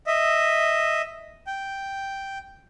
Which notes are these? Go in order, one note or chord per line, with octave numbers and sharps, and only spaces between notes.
D#5 E5
G5